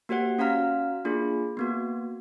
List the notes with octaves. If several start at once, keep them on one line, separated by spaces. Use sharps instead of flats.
A#3 F#4 G4 C5 F#5
C#4 F#4 F5 A#5 F6
A#3 D4 F4 G#4
A#3 B3 F#4